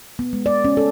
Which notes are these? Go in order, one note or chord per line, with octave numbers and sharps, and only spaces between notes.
B3
G#3
D5
C#4
A4